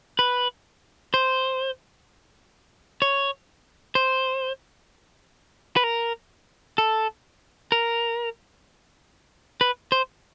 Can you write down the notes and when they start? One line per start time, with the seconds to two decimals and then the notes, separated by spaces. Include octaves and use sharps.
0.19 B4
1.14 C5
3.02 C#5
3.95 C5
5.76 B4
5.84 A#4
6.78 A4
7.72 A#4
9.61 B4
9.92 C5